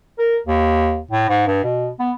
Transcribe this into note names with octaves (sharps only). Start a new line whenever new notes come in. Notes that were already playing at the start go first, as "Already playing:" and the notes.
A#4
D#2
A2
G#2
G2
B2
B3